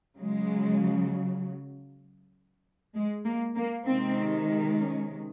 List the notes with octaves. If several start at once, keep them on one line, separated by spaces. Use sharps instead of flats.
C#3 F#3 G#3
G#3
A#3
A#3
C3 D#3 G#3 C4
C#4